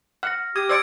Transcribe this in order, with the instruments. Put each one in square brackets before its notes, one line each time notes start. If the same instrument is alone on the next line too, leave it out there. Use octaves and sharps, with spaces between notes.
[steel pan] F#5 [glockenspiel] F6 A#6
[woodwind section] G4 [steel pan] D#6 [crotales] G#6
[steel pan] C5 D5 C#6 [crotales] E6 G#6 D7